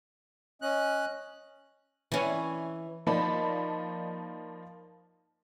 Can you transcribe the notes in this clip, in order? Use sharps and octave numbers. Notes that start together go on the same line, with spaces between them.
C#4 D#5 F#6
E3 C#4
F3 A#3 D#4 D5 A5 B5